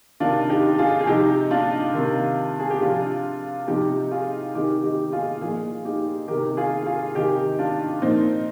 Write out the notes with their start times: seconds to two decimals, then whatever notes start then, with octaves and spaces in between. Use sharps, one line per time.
0.20 C3 D#3 D4 F4
0.49 D#4 G4
0.78 F4 G#4
1.00 G#4
1.07 C3 F3 D#4 G4
1.51 D4 F4
1.94 C3 D#3
2.60 G#4
2.70 G4
2.81 C3 F3 D4 F4
3.68 C3 F3 D#4 G4
4.11 F4 G#4
4.55 C3 D#3 D#4 G4
4.83 D#4 G4
5.13 F4 G#4
5.41 A#2 F3 F4 G#4
5.85 D#4 G4
6.28 C3 D#3 G4 A#4
6.57 F4 G#4
6.86 F4 G#4
7.15 C3 D#3 D#4 G4
7.59 D4 F4
8.02 A#2 F3 C4 D#4